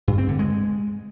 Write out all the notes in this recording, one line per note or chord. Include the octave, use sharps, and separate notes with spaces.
G2
C4
D3
G#3